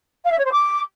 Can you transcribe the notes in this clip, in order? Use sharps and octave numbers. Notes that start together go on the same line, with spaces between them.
F5
E5
C#5
C5
D6